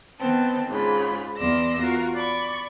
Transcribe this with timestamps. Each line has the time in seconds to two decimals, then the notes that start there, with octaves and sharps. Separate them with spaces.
0.19 D#3 B3 C4 A5
0.68 G#2 C#3 F4 B5
1.37 E2 D5 C6 E6 A#6
1.80 F4 F#4 A#4
2.15 D5 B5 C#6